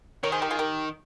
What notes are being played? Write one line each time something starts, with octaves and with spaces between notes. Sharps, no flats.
D#3 A#4 C#5
G#4 C5
G4 A#4
F4 G#4
G4 A#4